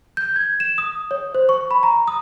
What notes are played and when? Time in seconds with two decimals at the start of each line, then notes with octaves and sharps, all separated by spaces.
0.17 G6
0.36 G#6
0.60 E7
0.78 D#6
1.11 C#5
1.35 C5
1.49 C#6
1.71 B5
1.83 A#5
2.08 D#6